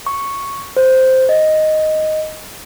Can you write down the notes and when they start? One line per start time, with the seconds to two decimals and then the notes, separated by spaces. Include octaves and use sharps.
0.06 C#6
0.77 C5
1.29 D#5